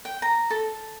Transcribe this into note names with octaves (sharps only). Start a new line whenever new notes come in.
G5
A#5
A4